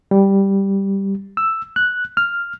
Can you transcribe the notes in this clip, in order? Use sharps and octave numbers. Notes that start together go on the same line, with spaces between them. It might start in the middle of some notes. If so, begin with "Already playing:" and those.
G3
E6
F#6
F6